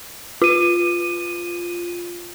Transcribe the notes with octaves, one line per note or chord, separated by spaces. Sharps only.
F4 D#7